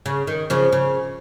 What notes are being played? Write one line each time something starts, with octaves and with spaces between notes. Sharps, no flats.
C#3
D#3
C#3 F3
C#3